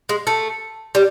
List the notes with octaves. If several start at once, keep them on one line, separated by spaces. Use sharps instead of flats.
G#3
A3
G3